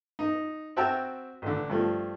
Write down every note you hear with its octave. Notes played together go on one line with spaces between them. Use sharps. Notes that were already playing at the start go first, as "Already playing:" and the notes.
D#4
C4 F#4 E5 G5 A5 A#5
A1 D3
G2 F3 A3